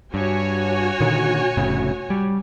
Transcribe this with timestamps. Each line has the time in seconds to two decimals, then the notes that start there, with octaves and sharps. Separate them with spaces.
0.14 G2 F#4 C#5 G#5
1.00 A#2 D3 D#3
1.57 F1 A2 C#3
2.10 G3